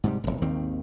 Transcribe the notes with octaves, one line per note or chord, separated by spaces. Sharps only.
G#2 C3 G3
E1 C2
G#1 D#2 D#3 C4